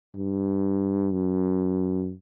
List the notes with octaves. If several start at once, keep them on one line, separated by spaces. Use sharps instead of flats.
G2
F#2